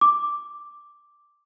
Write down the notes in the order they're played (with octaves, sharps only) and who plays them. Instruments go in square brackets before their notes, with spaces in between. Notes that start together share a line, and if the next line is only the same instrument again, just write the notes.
[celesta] D6